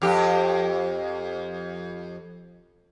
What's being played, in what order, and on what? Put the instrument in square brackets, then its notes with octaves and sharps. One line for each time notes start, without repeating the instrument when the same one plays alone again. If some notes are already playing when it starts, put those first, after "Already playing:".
[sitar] F2 G4